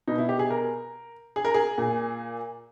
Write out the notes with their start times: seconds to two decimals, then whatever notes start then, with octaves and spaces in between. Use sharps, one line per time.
0.07 B2 D#4
0.18 E4
0.29 G4
0.39 G#4
0.50 A#4
1.36 G#4
1.45 A#4
1.54 G#4
1.78 A#2